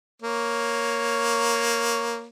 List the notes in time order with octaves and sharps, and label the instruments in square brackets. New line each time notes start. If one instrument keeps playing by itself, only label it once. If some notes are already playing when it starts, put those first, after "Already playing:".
[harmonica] A#3 C#5